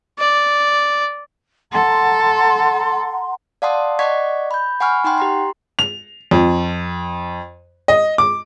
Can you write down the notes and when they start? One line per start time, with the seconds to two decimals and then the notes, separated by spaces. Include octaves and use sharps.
0.19 D5
1.73 A4 F#5 A#5 C6
3.62 D5 F5 F#5 A5 C6 D#6
3.99 D5 D#5 F#5 C#6 G#6 B6
4.51 B5 G6
4.80 F#5 G#5 B5 C#6 F6
5.04 D#4 F#5 G5 C6
5.18 G4 A#5 C6
5.79 F7
6.31 F2
7.88 D#5
8.18 D6